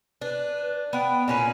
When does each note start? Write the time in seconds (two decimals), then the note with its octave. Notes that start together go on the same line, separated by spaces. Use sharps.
0.21 D4 B4
0.93 B3 F#5 G5
1.28 A#2 C#4 B4 G#5